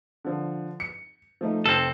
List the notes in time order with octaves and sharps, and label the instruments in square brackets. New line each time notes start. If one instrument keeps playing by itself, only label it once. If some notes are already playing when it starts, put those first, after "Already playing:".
[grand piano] D3 F3
C#7
F3 A3 D#4
[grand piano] F1 [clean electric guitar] C4 A4